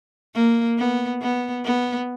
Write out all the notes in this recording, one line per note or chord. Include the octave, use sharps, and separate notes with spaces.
A#3
B3
B3
B3